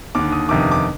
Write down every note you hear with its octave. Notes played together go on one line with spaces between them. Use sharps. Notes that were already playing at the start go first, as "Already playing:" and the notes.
D#2 D3 D6
D#6
G1 F2 C3 D#3 D6
D#6
D6